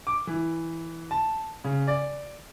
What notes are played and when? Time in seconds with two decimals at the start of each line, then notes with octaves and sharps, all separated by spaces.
0.07 D6
0.27 E3
1.11 A5
1.64 C#3
1.87 D5